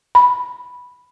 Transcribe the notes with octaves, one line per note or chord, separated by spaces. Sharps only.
B5